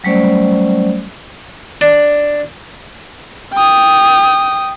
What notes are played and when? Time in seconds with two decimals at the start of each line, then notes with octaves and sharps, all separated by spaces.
0.04 F#3 G3 A3 C#4 C5 D5
1.81 D4
3.54 G5 D#6